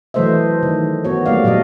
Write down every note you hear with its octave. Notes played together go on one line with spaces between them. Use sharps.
E3 F#3 A3 C5 D#5 E5
D#3
B3 F#4 C#5
G3 A3 A#3 D5 F5
A#2 F#3 F#4 D5 D#5